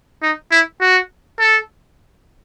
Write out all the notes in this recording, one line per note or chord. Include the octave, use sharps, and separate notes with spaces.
D#4
E4
F#4
A4